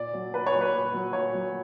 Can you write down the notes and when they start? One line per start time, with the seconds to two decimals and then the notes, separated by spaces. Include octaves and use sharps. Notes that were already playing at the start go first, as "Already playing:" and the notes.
Already playing: A#2 D5
0.13 F#3
0.34 A#2 B4
0.46 C#5
0.54 F#3
0.61 B4
0.74 A#2
0.93 F#3
1.13 A#2 C#5
1.33 F#3